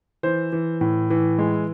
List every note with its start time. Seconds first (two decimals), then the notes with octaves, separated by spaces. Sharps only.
0.23 E3 C5
0.52 E3
0.81 A2
1.10 E3
1.39 G#3